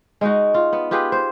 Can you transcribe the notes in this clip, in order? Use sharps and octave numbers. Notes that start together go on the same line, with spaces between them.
G#3 D#4 F#4
F4
B3
F4 G4 G#4 B4
C5